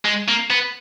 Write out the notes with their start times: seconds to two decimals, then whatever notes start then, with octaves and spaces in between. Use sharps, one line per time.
0.05 G#3
0.28 A#3
0.50 B3